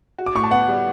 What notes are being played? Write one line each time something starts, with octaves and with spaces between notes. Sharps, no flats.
F#4
D6
A2 C#6
A5
B3 F#5
G3